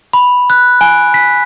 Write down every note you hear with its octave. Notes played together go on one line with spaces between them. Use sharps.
B5
F#6
G#5
B6